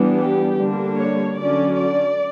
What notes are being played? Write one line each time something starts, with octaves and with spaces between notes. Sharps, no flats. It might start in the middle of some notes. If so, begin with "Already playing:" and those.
Already playing: E3 G3 B3 D4
G4
D3 G3 A#3 D4
C#5
D3 F#3 C#4 D5
D5